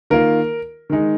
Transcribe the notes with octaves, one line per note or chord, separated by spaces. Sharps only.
D#3 A#3 F4 A#4
D#3 G#3 D#4